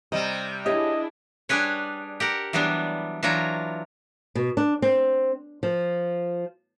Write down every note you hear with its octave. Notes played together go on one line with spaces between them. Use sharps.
C3 G3 D#5
D4 E4 G4 G#4 C#5 D#5 E5
G3 D4 G#4 B4 C#5
G4 A#4 F#5
E3 F#3 G3 B3 D4
E3 F#3 D4 F4 C#5 A#5
B2
D4
C4
F3